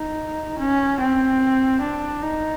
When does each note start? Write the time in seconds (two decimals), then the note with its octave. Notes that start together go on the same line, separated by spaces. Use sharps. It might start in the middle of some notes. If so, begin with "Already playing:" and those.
Already playing: D#4
0.59 C#4
1.00 C4
1.81 D4
2.22 D#4